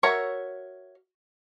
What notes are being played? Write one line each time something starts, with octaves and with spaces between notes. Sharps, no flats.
F#4 A#4 C#5 E5